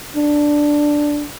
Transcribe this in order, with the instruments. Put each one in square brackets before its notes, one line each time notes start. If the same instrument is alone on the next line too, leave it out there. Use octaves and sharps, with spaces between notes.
[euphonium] D4